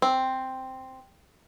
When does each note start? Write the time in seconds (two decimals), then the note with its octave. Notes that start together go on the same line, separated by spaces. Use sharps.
0.02 C4